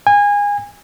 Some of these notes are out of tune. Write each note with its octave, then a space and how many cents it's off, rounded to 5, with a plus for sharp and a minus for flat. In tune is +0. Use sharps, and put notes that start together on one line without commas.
G#5 -25